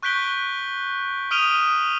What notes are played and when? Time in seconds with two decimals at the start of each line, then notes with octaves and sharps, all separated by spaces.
0.03 C#6 F#6 G6 B6 D7 G7
1.31 D#6 F6 D7 D#7 F7 G7